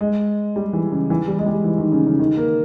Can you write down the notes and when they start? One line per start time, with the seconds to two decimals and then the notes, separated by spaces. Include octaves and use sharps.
0.01 G#3
0.56 G3
0.73 E3
0.92 C#3
1.10 E3
1.28 G3
1.39 G#3
1.46 G3
1.64 E3
1.78 D#3
1.92 C#3
2.06 C#3
2.19 D#3
2.37 A#3